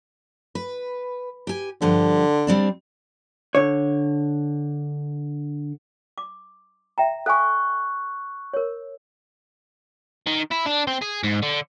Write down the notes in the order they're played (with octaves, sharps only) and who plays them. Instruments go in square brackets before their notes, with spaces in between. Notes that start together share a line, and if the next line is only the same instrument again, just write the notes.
[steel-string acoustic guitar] B4
G4 G#5
[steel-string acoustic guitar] G2 F3 G4 [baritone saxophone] D3
[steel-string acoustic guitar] G3 C4 D4
[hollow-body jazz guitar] D3 C#5
[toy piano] D6
E5 G5 A#5
[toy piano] A4 F5 G#5 [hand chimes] C#6 F#6
[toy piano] A#4 C#5
[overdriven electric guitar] D#3
E4
D4
C4
G#4
G#2
D3